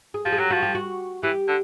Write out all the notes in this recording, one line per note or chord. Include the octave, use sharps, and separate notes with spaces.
G#4
F3 G4
G#4
F#3 G4
F3 F#4
G4
F#4
E3 G4
D3